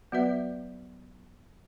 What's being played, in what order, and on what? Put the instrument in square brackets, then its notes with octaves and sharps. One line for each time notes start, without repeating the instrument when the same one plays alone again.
[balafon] F#3 B3 F#4 B4 E5